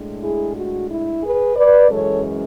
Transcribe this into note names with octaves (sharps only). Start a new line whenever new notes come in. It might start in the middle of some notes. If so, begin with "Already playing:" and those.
Already playing: A2 G#3 D4
E4 G#4
F#4
E4
G#4 B4
B4 D5
F#2 E3 G#3 C#4 A4 C#5